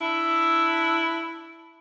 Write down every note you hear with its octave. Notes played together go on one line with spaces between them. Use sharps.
D4 E4